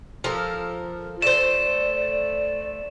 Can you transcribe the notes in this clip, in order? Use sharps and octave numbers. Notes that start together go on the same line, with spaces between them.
F3 A4 A#4
A3 C5 D5 E7